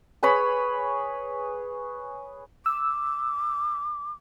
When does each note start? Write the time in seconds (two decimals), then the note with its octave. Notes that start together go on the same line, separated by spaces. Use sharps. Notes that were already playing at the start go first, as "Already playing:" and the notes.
0.23 G#4 B4 C#5 B5
2.66 D6 E6